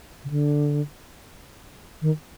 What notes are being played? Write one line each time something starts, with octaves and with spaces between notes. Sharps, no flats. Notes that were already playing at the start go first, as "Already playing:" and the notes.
C#3
D3
D#3